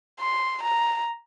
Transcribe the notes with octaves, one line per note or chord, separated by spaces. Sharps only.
C6
A#5